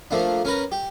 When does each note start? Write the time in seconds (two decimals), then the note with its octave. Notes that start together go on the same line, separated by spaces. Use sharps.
0.11 F3 A3 A#3 D4
0.45 C#4 A#4 B4 A#5
0.72 G4